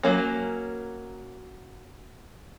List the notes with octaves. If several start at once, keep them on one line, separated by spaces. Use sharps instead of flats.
F#3 A#3 C#4